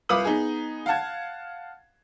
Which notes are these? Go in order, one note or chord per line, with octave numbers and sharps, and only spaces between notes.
C2 F4 B4 D6 D#6 F#7
B3 D#4 G#4
F5 F#5 A5 G#6